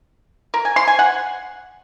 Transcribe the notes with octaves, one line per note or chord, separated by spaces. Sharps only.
A#4
G#5
C6
G#5
F#5